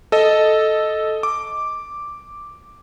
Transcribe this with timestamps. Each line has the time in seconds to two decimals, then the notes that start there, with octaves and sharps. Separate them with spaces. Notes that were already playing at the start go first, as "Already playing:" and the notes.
0.12 A4 D#5
1.23 D6